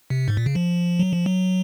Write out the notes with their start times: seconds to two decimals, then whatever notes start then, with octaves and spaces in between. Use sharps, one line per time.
0.10 C3
0.28 G#2
0.37 A#2
0.46 C#3
0.55 F3
0.99 F#3
1.13 F3
1.26 F#3